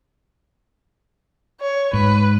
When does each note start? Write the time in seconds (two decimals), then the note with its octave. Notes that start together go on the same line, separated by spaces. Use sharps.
1.60 C#5
1.93 G#2 B4